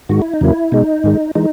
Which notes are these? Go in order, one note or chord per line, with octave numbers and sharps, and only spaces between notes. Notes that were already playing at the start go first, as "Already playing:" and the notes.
G#2 D#3 G#3 F#4
E4
D#4
E2 C#3 F#3 A#3 E4
B2 G#3 D#4
G#2 D#3 G#3
E3 G#3 D#4